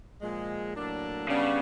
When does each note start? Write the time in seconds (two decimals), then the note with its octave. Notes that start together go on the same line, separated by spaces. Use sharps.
0.22 A#2 F3 G#3
0.75 A2 F#3 A#3 D4
1.28 C#3 G3 B3 D4